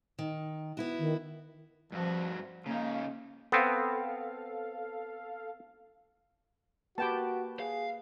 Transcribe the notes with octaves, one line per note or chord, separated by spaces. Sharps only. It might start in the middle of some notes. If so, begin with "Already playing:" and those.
D#3
B3 E4 F#4
D#3
G2 F3 F#4
C#3 A#3 D#4
B3 C4 A4 F5
A#3 F#4 G4 B4 G5 A5
G#4 F5